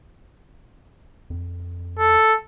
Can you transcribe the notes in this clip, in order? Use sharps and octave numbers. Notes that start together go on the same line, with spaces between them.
F2
A4